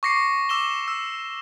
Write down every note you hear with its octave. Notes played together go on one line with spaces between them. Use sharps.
C#6 D6 A#6 C7 C#7
D6 E6 E7 G7
E6